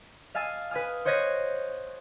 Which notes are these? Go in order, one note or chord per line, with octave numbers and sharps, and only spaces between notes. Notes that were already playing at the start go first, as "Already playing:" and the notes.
D#5 F5 G#5 A5 E6
B4 G#5 D#6 F6
C5 C#5 D#5 F#6 G#6 A#6